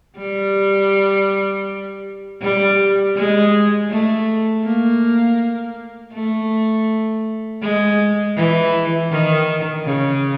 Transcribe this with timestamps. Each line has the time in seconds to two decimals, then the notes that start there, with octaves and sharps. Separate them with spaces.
0.18 G3
2.41 G3
3.16 G#3
3.90 A3
4.64 A#3
6.13 A3
7.62 G#3
8.36 E3
9.11 D#3
9.84 C#3